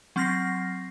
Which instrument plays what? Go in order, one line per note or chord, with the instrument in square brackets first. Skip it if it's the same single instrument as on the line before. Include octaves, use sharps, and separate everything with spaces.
[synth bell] F#3 C4 F6 A6 A#6 C7